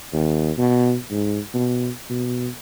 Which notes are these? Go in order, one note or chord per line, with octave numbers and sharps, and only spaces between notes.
D#2
B2
G#2
B2
B2